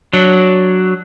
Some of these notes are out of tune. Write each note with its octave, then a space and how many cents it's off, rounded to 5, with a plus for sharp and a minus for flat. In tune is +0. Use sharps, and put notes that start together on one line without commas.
F#3 +0 D4 +0